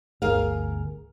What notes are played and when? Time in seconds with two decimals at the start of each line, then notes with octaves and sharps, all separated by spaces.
0.22 G1 D2 G#4 A#4 F5